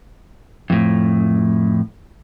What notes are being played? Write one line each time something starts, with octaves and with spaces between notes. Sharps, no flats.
F2 A2